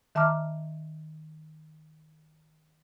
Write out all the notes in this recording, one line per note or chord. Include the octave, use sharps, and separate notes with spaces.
D#3 E5 A5 A#5 D6 F6